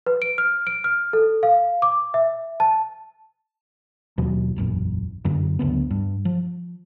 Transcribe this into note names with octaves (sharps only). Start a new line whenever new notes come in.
B4
D7
F6
D7
F6
A4
F5
D6
E5
A5
D#2 B2 F#3
E1 A#1 F#2
F#2 D3
D2 C#3 F#3 B3
G2
F3